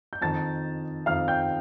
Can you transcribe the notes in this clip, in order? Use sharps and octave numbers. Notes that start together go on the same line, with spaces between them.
G6
F2 D#3 A5 A6
F2 D#3 F5 F6
G5 G6